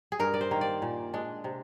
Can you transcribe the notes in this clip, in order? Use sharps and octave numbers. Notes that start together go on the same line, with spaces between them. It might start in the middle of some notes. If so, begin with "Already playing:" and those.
G#4
G2 A#4
D5
C5
D#3 A#3
D5
A#2
G#3 D4
C3